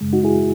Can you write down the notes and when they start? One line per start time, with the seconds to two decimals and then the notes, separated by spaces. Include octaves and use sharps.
0.01 F#2 C#3 G#3
0.13 D#4 F#4
0.24 E4 G#4